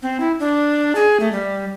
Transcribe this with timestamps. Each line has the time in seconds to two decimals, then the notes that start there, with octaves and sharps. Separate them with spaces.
0.02 C4
0.20 E4
0.40 D4
0.95 G#4
1.20 A3
1.32 G3